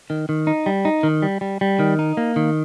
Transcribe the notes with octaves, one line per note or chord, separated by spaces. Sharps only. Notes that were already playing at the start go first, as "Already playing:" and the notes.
D#3
D#3
D#4
G3
D#4
D#3
G3
G3
G3
D#3
D#4
A#3
D#3